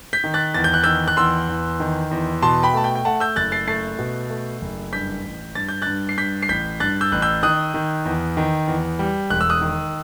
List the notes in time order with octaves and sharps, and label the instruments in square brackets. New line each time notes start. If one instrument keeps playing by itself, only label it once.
[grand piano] G6 B6
D#3
F#6 A6
E2 A6
G6
F#6
D#3 E6 G6
F#6
E2 C6 E6
E2
D#3
E2
B2 A5 C6
G5 B5
A3 A5
G5
G5
A3 F#5 A5
E6 G6
F#1 F#6 A6
A6 C7
A3 A6 C7
B2
A3
F#1
G2 G6 B6
A1
G2 A6
G6
G2 F#6 A6
C7
G2 G6 B6
C7
A1 G6 B6
G2 F#6 A6
E6 G6
A1 F#6
E6 G6
D#3 D#6 F#6
D#3
E2
D#3
E2
G3
E1 F#6
E6
D#6 F#6
D#3